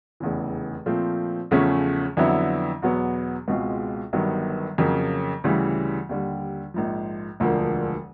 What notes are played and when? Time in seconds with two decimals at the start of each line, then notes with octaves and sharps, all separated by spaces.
0.20 F1 E2 C#3 E3
0.86 A#2 F3 A3 C4 F4
1.51 E2 C#3 F3 A3 C#4
2.17 F2 D3 F#3 B3 E4
2.82 E2 B2 F#3 B3
3.48 C#2 B2 G#3 C4 F4
4.13 G1 G2 D#3 F#3 B3
4.78 F2 C#3 F#3 A#3
5.44 D2 C#3 E3 G3
6.09 D#2 D3 G3
6.74 A#1 G#2 F3
7.40 E1 D2 D3 F3 A#3